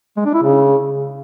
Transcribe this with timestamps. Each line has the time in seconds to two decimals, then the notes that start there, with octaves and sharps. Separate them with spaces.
0.17 G#3
0.25 D4
0.34 E4
0.43 C#3